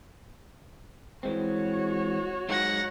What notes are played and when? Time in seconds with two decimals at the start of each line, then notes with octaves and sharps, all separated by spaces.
1.23 E3 G#3 C4 F#4 C#5
2.49 F#3 G#3 D#4 F#5 A#6